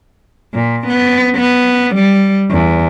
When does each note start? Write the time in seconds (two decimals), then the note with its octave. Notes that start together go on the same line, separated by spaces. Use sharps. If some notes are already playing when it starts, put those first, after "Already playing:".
0.54 A#2
0.88 B3
1.36 B3
1.94 G3
2.51 E2